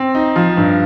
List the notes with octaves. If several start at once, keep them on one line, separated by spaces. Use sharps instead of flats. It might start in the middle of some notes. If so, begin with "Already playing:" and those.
Already playing: C4
D#4
F3
G2